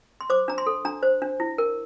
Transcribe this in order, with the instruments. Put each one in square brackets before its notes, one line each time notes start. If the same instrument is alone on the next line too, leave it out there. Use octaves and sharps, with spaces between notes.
[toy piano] C6
C5 D6
D4 A#5
C6
A4
D4 A#5
C5
D4
E4
A#4